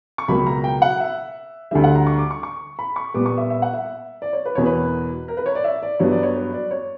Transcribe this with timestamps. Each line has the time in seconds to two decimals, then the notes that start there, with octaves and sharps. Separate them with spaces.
0.18 C#6
0.28 C#2 B2 F#3 A#3 B5
0.47 A#5
0.64 G5
0.82 F#5
1.00 E5
1.71 D2 D3 G3 E5
1.84 F#5
1.96 A#5
2.07 C#6
2.19 D6
2.31 C#6
2.43 C#6
2.79 B5
2.96 C#6
3.14 A#2 G3 B3 D6
3.26 C#6
3.38 E5
3.50 E5
3.62 F#5
3.73 E5
4.22 D5
4.33 C#5
4.45 B4
4.55 E2 B2 A#3 C#5
4.66 B4
5.28 A#4
5.37 B4
5.46 C#5
5.55 D5
5.64 E5
5.83 D5
5.99 G2 F#3 B3 C#5
6.12 D5
6.23 C#5
6.36 B4
6.54 D5
6.71 C#5